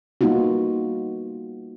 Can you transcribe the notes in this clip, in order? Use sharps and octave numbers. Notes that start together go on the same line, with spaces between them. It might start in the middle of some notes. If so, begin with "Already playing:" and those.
G3 A#3 B3 D#4 F4 F#4